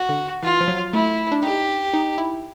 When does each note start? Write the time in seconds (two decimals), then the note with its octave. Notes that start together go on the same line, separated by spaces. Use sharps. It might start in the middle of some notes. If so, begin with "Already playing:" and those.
Already playing: F#4
0.09 D3
0.43 E3 F4
0.61 F3
0.68 F#3
0.93 A3 E4
1.32 D4
1.43 D#4 G4
1.94 D#4
2.18 E4